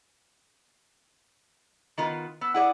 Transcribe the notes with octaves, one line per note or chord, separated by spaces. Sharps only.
D#3 B3 F4
B3 E6
E4 G#4 D5 F#5